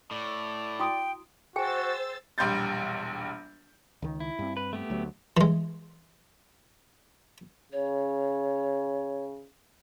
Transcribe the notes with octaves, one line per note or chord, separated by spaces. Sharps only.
A2 D5
E4 F#4 G5 D#6
F#4 G#4 C5 G5 G#5 E6 A6
E1 A#1 G3 C6 G6 A6
C#2 D#3
E4
G2 C4
B4
A3 B3 G4
D2 F#3
E3 G#3
C#3 C#5